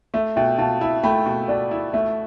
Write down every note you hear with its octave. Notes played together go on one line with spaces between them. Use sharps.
A3 E5
B2 E5 G5
B2 F5 A5
E4 E5
A3 G5 B5
B2
B2 D5
E4
A3 E5